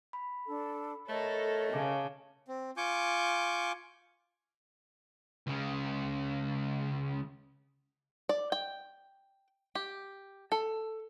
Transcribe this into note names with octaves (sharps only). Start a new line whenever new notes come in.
B5
D4 A4
A3 A4 A#4 C#5 D#5
C#3 G#5 A5 D6
C4
F4 G#5 C#6 D6 G6
C#2 C#3
D5
G5
G4
A4